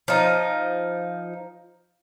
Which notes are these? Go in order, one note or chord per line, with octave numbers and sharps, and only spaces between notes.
F3 D#4